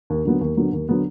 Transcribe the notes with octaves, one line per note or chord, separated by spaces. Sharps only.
D#2
D3 F#3 B3
D#2
D3 F#3 B3
D#2
D3 F#3 B3